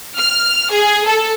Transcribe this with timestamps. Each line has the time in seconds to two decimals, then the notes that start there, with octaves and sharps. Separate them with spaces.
0.17 F6
0.70 G#4
1.05 A4